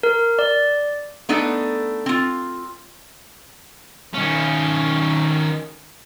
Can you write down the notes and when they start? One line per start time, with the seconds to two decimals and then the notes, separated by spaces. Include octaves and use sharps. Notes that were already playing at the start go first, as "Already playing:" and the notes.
0.03 A#4
0.39 D5
1.29 A3 B3 D4 D#4 A4
2.06 C4 F4
4.14 D#3 C#4